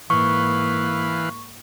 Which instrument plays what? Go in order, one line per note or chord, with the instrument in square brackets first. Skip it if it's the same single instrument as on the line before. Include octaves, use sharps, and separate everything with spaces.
[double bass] G#2 A#3 [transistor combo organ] E3 B4 F5 [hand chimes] C#6